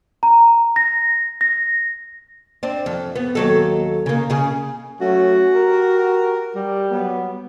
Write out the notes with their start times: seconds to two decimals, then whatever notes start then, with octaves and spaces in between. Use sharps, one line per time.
0.23 A#5
0.76 A#6
1.41 A#6
2.63 C4 D4
2.86 F2
3.16 B3
3.35 D#2 F#3 A4
4.06 C#3 A#3
4.30 C#3 G#4
5.01 F#3 A3 C#4 F#4
5.55 G4 A#4
6.55 G3
6.92 F#3 B3